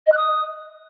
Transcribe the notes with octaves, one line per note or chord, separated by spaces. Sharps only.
D#5
F#6
D#6